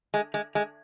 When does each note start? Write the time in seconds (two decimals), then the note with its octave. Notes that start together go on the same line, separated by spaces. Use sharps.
0.14 G#3
0.34 G#3
0.55 G#3